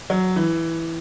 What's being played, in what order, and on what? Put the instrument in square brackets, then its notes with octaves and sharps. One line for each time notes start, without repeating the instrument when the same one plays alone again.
[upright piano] F#3
E3